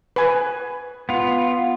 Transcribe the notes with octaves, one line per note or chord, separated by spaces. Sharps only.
B4 G#5
B3 F4